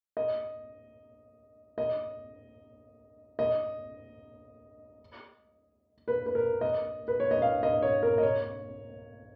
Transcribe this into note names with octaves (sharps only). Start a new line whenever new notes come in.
D#5
D#5
D#5
B4
B4
A#4
D#5
B4
C#5
D#5
F5
D#5
C#5
A#4
D#5
C#5